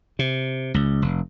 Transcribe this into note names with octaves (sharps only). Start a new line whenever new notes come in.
C3
C#2
F1